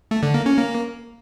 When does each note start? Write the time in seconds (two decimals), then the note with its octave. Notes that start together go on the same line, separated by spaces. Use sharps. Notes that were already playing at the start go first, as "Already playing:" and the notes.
0.11 A3
0.23 D3
0.34 A#3
0.46 C#4
0.57 A#3